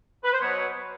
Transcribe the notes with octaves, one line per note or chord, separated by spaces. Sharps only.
B4
C5
B2 F#3 B3 C#5